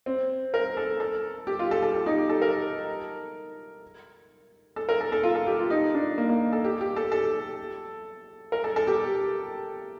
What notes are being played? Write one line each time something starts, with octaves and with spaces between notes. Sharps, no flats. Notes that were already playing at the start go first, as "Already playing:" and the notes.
C4
A#4
A4
A4
G4
F4
A4
A4
G4
D#4
G4
A4
A#4
A4
A#4
A4
A4
F4
A4
G4
F4
D#4
D4
A#3
A#3
A4
G4
G4
A4
A4
A#4
A4
A4
G4